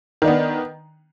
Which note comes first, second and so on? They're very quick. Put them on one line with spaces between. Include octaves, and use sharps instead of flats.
D#3 D4 B3